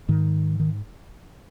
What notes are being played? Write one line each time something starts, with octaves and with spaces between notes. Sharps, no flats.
G#2 D#3
D#3